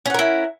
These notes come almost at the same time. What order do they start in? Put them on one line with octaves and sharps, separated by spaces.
C#4 F#5 A#4 E4